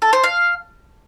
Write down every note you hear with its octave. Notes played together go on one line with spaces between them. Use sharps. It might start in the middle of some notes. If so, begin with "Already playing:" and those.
A4
C5
F5